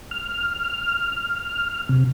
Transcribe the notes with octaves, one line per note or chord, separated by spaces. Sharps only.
F6
C3